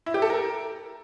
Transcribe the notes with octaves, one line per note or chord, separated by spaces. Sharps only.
E4
G4
A4
A#4